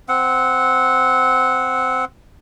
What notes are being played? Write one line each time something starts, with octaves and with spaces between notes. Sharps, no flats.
C4 F#5